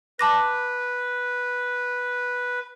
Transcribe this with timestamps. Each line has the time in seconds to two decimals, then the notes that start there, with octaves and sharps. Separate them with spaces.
0.19 B4 A5 D6 A#6